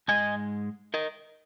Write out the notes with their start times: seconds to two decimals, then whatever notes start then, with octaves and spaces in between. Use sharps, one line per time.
0.08 G#2 G#3 D#5 G#5
0.94 A#4 D#5